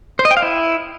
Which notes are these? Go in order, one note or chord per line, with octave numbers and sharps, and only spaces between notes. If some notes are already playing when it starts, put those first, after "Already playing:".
C5
D#5
G5
F5
E4